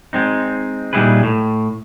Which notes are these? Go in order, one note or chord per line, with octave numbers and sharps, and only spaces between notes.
G#3 C4 D#4
A#2 G3 D#4 E4 G#4 B4
A2